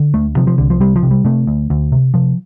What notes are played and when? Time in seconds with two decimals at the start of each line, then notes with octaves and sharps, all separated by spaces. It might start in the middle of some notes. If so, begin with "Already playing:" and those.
Already playing: D3
0.14 D2 A3
0.37 C3 F3
0.47 F3
0.58 C2 D3
0.70 F3
0.80 C3 G3
0.96 F3
1.03 C3
1.11 G3
1.25 C3 A3
1.47 D2
1.70 D2
1.92 C3
2.14 C3 F3